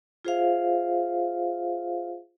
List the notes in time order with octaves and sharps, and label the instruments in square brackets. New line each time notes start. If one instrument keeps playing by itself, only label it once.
[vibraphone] F4 G#4 C5 E5 F5